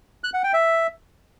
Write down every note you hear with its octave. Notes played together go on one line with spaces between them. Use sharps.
F#6
F#5
G5
E5